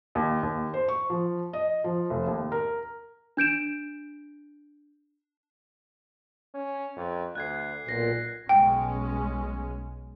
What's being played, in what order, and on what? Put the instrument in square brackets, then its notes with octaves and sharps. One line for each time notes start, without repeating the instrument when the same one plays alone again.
[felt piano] D#2
D#2
C5
C#6
F3
D#5
F3
F1
D#2
A#4
[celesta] D4 G6 D7 E7
[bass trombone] C#4
F2
[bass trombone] D2 [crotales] F#6 G#6 C7
[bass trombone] B1 [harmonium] A#2 [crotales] A#6 C7
[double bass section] B1 G#3 C#4 [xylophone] G5